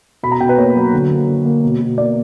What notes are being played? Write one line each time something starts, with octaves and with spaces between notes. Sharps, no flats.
B2 B5
A#5
B2 G5
B4
A#3 C#5
F#3
D3
A#3
D3
A#3
B2
B2
A#3 D5